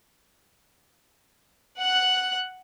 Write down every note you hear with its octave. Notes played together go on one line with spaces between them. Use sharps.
F#5 F#6